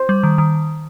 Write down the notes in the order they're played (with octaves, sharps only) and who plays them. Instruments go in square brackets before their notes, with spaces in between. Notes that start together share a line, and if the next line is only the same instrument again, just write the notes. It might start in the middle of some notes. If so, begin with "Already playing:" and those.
Already playing: [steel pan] C5
[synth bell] G3
D#3
D#3